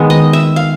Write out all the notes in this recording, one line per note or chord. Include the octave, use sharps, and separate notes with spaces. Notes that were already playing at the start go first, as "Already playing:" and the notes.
Already playing: D#3 G#3 B3
D#5
E5
F5